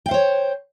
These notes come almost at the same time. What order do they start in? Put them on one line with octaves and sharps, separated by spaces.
G5 F5 C5 C#5